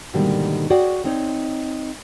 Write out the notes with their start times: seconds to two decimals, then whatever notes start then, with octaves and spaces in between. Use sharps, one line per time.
0.14 G#2 B2 D3 D#3 G3 A#3
0.70 F#4 G#4 C#5 D5 F#5 G5
1.04 C4 D#4 C#5